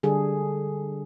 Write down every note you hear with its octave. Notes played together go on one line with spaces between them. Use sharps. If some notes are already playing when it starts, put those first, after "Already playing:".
D3 G3 G#4 A4